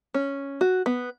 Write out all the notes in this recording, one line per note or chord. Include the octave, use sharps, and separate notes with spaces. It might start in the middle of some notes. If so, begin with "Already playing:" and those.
C#4
F#4
B3